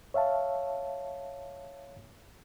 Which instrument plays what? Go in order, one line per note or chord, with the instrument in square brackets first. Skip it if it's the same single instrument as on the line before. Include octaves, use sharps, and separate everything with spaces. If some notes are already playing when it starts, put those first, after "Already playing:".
[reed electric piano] C#5 E5 F5 A5